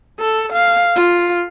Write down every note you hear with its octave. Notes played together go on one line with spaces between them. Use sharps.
A4
F5
F4